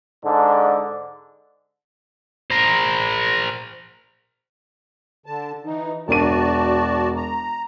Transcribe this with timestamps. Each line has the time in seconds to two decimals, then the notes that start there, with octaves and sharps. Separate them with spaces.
0.24 G#2 D3 D4
2.51 A#4 C5
5.26 D3 A5
5.65 E3 D#4
6.08 E1 D4 F#4 D5 A5 D#7
7.16 A#5